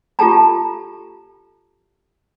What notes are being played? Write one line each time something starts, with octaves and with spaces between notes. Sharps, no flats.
F4 G4 A4 A5 A#5